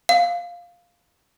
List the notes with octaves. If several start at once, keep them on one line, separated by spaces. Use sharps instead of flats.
F5